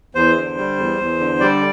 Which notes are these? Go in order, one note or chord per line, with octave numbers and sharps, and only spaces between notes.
E2 C5
D3
G3
E2
E2
D3
G3 D5